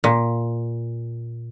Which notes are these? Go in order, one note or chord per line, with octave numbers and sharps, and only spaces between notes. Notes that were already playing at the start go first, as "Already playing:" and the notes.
A#2